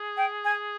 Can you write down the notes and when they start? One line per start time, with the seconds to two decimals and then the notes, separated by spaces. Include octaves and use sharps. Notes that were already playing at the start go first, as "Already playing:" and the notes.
Already playing: G#4
0.16 G5
0.44 G#5